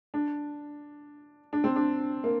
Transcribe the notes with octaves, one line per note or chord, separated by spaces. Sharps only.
D4
D4
C4
D4
A#3